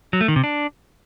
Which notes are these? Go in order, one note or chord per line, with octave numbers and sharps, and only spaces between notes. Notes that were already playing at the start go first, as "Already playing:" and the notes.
F#3
A3
D#3
C3
D4